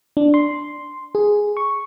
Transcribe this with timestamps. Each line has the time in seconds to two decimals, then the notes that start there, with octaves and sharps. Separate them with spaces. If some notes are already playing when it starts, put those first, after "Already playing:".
0.17 D4
0.34 C6
1.15 G#4
1.57 C#6